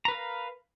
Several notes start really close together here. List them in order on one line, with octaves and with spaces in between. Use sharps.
A#5 B4 A#4 F5